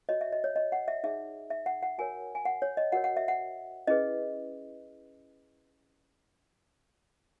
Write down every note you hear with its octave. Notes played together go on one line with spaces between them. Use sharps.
F#4 C#5 D#5
E5
D#5
C#5
D#5
F#5
E5
D#4 G#4 C#5 E5
E5
F#5
F#5
F#4 A#4 C#5 G#5
G#5
F#5
C#5
D#5
F#4 A#4 C#5 F#5
F#5
E5
F#5
C#4 E4 G#4 B4 D#5